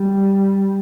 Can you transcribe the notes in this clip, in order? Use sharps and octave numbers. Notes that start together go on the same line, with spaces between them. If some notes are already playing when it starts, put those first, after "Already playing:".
Already playing: G3